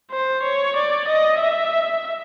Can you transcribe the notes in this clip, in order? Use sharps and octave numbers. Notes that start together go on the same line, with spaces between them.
C5
C#5
D5
D#5
E5